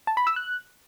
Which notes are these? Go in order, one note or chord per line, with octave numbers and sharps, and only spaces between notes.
A5
B5
E6
F#6